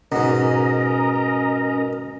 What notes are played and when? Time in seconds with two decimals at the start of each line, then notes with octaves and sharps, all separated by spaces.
0.12 G#2 B2 C#4 A#4 D#5 A#5